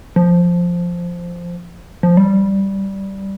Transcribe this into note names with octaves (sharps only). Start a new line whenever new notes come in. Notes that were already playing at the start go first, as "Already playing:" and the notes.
F3
F3
G3